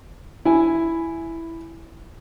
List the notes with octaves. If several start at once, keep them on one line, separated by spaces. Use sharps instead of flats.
E4 G#5